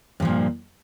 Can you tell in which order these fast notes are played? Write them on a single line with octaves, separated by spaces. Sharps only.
G2 F3 A#2